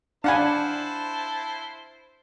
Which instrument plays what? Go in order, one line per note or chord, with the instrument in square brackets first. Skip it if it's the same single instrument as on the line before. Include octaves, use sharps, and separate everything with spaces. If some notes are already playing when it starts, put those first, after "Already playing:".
[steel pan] D4 G#5 [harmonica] E4 C5 A5 [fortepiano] F5 F#5 B5